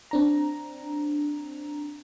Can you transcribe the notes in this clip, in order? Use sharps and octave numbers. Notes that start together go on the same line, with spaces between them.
C4 D4 A#5